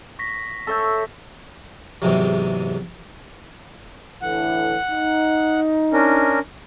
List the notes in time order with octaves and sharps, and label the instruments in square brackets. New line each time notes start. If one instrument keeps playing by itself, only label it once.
[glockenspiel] C#6 A#6 B6
[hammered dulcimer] A4 C#5 E5 [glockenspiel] A5 C#6 G6
[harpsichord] E2 G#2 C3 F#3
[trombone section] A2 D3 E3 [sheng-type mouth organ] F#5
[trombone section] D#4
[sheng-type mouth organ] C#4 D4 A#4